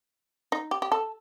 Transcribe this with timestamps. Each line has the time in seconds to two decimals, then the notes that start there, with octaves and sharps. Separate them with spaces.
0.52 D#4
0.71 G4
0.82 G4
0.92 A4